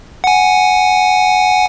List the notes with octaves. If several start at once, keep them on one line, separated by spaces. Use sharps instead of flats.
F#5 G#5